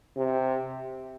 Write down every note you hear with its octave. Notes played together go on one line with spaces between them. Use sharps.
C3